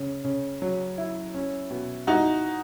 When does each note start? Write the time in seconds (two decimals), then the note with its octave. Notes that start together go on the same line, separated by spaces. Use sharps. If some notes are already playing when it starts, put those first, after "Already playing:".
Already playing: C#3
0.24 C#3
0.62 F#3
0.98 E4
1.35 C#4
1.70 B2
2.07 D#4 E4 F#4